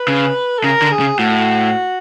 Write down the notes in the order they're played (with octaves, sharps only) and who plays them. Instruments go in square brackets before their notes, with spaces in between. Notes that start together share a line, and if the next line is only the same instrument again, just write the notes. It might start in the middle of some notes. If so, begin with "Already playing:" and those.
Already playing: [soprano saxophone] B4
[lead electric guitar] C#3
[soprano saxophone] A4
[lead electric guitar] C#3 [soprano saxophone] A#4
[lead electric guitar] D3
[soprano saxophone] G#4
[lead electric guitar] C#3
[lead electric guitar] A2 [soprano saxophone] F#4